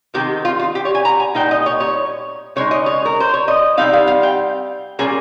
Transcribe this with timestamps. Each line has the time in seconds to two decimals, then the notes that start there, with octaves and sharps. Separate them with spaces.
0.14 C3 D#3 G#3 C4 G4
0.45 F4
0.59 F4
0.75 G4
0.85 C#5
0.95 G#5
1.05 A#5
1.20 G#5
1.35 A#2 G3 A#3 D#4 G5
1.51 D#5
1.66 C#5
1.80 C#5
2.56 C#3 G#3 D#4 C#5
2.71 D#5
2.86 C#5
3.05 A#4
3.20 C5
3.34 C#5
3.48 D#5
3.77 C3 G3 C4 D#4 F5
3.93 F5
4.08 F5
4.23 G5
4.99 A#2 G3 A#3 C#4 G#4